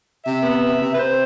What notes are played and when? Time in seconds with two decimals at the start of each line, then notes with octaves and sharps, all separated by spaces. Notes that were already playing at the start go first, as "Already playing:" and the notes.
0.25 C3 E5
0.43 B3
0.62 C3
0.81 C3
0.94 B4
0.99 C3 C5